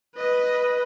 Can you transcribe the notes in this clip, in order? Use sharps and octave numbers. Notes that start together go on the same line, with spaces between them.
B4 D#5